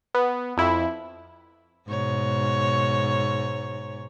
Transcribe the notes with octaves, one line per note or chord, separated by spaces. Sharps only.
B3
F2 E4
G#2 B2 C#5